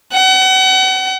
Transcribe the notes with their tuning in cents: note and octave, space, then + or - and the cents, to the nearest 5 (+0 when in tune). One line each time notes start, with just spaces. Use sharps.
F#5 +35